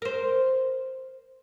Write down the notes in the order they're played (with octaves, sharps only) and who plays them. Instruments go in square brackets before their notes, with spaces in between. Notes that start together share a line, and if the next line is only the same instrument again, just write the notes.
[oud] A#4 C5